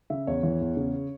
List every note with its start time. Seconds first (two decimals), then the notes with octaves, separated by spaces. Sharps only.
0.10 C#3 E5
0.27 E2 C#5
0.43 E3
0.61 E2
0.77 C#3